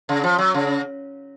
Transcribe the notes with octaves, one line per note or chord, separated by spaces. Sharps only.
C#3
F3
F#3
C#3